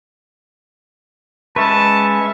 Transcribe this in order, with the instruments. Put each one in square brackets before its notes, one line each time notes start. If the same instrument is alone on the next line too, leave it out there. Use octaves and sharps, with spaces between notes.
[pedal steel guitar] G#3 B4 [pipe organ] C#4 E5 C#6 [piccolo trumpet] A5